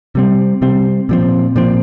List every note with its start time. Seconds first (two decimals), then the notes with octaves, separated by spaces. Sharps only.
0.15 C3 G3 C4
0.62 C3 G3 C4
1.09 A#2 F3 C4
1.56 A#2 F3 C4